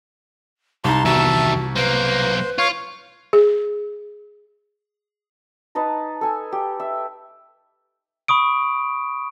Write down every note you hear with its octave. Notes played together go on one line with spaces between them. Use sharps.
C2 D#4 A5 A#5 C6
E2 D#3 F#4 E5 A5
B1 A#3 B4 C5
F4 C#5 F5 C#6
G#4
D#4 B4 A5 A#5
A4 G#5
G4
E5
B5 C#6 D#6 D7